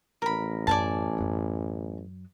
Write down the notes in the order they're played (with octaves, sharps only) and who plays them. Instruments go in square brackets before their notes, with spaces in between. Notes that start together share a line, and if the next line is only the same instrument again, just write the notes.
[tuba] A1 [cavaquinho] A#4 B5
[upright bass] F#2 [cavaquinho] D5 G#5 A5
[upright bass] F#2 F#3